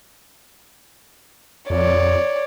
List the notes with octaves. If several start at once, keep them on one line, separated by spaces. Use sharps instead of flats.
F2 C#5 D5